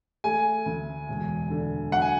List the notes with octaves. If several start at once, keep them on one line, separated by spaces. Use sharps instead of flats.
A3 G#5
D2
E1
D3
F#3 F#5
G#5